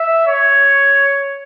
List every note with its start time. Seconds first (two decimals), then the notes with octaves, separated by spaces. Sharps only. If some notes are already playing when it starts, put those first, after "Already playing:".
Already playing: E5
0.27 C#5